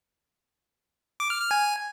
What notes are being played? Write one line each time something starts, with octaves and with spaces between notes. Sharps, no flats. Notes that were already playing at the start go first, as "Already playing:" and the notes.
D6
F6
F6
G#5